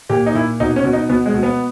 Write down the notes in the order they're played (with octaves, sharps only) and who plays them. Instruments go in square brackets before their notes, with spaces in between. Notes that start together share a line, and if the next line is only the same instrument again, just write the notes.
[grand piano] A#2 G4
D#4
A#2 E4
B2 D#4
C#4
B2
D#4
B2 B3
G#3
B2
B3